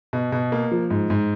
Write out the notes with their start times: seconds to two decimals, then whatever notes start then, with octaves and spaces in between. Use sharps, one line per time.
0.13 B2
0.32 B2
0.52 A#3
0.71 F3
0.90 G#2
1.10 G#2